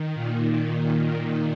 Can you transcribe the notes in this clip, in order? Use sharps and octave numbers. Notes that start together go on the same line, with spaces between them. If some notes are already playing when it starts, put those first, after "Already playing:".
Already playing: D#3
A#2